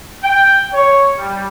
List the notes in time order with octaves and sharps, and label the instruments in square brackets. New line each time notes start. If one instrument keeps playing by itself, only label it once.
[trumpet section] G5
C#5
G3